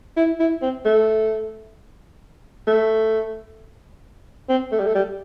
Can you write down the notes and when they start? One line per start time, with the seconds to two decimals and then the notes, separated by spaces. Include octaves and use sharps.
0.17 E4
0.40 E4
0.62 C4
0.85 A3
2.67 A3
4.49 C4
4.72 A3
4.79 G3
4.87 A3
4.95 G3